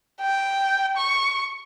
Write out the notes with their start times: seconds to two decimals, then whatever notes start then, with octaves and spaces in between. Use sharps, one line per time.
0.21 G5
0.97 C#6